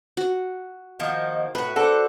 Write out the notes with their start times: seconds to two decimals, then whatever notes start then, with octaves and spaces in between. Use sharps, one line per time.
0.17 F#4
0.99 D#3 F3 A#3 D#5 F#5
1.55 A2 F#4 B4 E5
1.76 D4 F#4 A4 C5 D6 F#6